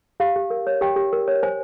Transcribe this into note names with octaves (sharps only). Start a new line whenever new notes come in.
G4 F5
G4
A#4
C#5
G4 G5
G4
A#4
C#5
C5 G#5